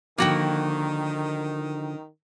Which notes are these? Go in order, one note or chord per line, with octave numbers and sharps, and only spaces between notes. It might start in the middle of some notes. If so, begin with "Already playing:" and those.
D3 D#3 F3 A#3 F#4 G5